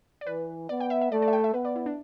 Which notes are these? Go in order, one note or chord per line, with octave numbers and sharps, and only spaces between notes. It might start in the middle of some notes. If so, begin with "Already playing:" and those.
D5
E3 B4
B3 D5
G5
E5
E5
A3 D5
D5
E5
G5
E5
B3 B4
D5
E4
D4